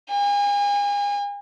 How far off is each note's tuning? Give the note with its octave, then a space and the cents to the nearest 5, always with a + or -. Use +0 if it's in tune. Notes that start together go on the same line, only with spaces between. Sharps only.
G#5 -40